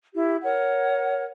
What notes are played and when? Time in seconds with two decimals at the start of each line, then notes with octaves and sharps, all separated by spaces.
0.14 E4 G4
0.43 A#4 C#5 F#5